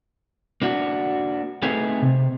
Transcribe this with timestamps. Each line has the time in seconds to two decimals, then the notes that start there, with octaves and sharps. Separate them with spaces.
0.62 A#3 D4 F#4
1.62 A3 C4 D#4 G#4 B4 C#5
2.02 C3